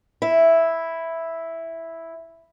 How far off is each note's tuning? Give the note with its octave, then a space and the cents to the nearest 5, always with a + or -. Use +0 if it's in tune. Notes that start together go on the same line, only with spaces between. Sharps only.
E4 +0